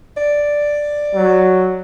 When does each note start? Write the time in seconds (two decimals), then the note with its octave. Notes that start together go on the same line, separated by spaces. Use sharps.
0.17 D5
1.15 F#3